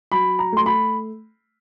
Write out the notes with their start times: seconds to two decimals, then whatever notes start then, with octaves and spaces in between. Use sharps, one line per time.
0.12 F#3 B5
0.39 A#5
0.52 A3 C6
0.66 B5